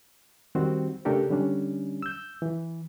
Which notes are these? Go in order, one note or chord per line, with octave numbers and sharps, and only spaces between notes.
D#3 G3 C4 F#4 C5
C#3 A3 D4 G4 A4 A#4
D3 G3 C#4 D4
E6 G6
E3